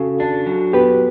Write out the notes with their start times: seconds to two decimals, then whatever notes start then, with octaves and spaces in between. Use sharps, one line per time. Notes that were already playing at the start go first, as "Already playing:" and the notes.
Already playing: C#3 F#4 A4
0.20 D4
0.46 F#3
0.73 B3 G4 B4